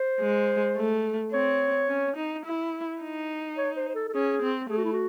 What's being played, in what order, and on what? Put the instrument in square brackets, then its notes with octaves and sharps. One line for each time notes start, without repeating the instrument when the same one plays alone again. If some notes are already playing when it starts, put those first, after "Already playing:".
Already playing: [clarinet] C5
[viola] G#3
A3
[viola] C4 [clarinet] C#5
[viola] C#4
D#4
E4
D#4
[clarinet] C#5
C5
C5
A4
A4
[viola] C#4 [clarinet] G#4
[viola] C4
[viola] A3 [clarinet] G#4
[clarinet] F#4
E4
F#4